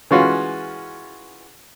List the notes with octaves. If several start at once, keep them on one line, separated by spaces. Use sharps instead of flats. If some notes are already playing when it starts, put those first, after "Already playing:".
E3 G#3 C#4 F4 F#4